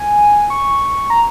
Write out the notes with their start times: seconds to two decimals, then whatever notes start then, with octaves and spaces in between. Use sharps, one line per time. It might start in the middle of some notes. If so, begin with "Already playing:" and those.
Already playing: G#5
0.50 C#6
1.10 A#5